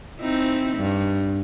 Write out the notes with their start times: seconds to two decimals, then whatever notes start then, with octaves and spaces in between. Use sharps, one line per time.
0.20 C4 D#4 E4
0.77 G2